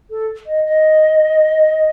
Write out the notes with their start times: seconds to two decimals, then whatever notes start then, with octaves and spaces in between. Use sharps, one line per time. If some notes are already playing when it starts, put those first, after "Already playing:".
0.10 A4
0.46 D#5
0.65 D#5